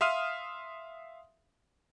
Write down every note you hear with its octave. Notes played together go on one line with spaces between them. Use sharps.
E5 F5 C6 D#6 F6 D#7